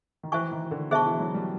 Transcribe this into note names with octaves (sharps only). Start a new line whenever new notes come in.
D#3
E3 C5 E5 G#5 C#6
D#3
D3
B2 G#4 C5 E5 A5 C#6
E3
F#3
G3